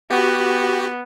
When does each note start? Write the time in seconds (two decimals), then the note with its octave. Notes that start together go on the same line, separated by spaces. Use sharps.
0.10 B3 F#4 G4